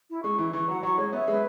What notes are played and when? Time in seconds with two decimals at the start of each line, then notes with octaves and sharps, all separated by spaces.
0.09 E4
0.23 G#3 C#6
0.38 E3 E4
0.53 E3 C#6
0.68 F#3 F#5
0.83 F#3 C#6
0.98 G#3 C#5
1.13 B3 E5
1.28 G#3 B4